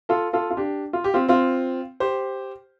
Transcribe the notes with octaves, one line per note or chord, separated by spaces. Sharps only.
F4 A4
F4 A4
F4
D4 G4
F4
G4
C4 F4
C4 F4
G4 C5